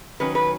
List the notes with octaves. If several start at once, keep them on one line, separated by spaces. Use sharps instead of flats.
D#3 F#3 C#4 B4
B4